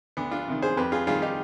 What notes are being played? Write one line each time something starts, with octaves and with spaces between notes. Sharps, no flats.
D2 B3 D4
D4 F4
C3 D#3
G#4 C5
F2 G4 B4
F4 G#4
D#3 G3 F4 G#4
D#4 G4